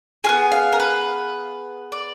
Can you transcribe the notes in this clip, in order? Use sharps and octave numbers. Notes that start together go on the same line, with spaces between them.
B3 F4 G#4 G#5
F5
A#4
B4
D5